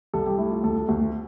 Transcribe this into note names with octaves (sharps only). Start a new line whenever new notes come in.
C2 A4
G4
A3 E4
F4
D2 A4
D2